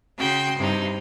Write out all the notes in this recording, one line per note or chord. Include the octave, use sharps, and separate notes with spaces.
C#3 F#4 G5 C6
G2 C3 D#4